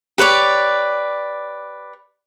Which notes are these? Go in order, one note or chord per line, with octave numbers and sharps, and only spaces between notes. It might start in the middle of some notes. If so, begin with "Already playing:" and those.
G4 B4 C#5 D5